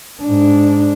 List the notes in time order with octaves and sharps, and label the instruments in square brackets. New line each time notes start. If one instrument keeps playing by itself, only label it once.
[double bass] G#2 D4